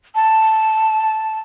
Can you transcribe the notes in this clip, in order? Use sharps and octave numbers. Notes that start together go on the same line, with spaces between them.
A5